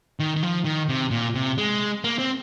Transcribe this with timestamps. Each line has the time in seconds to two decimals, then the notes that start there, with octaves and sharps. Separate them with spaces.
0.20 D#3
0.36 D#3
0.43 F3
0.65 D#3
0.89 C3
1.11 A#2
1.35 C3
1.58 G#3
2.04 A#3
2.19 C4